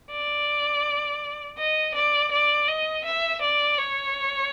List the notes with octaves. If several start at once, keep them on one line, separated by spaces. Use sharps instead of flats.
D5
D#5
D5
D5
D#5
E5
D5
C#5